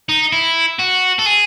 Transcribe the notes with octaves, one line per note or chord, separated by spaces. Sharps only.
D#4
E4
F#4
A4
G#4